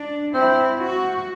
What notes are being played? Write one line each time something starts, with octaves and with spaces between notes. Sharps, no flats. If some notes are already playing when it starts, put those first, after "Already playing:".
Already playing: D4
C4 E4
F#4